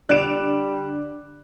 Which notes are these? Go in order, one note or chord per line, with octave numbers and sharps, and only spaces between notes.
D3 G3 D5 F#6 D7 E7 F7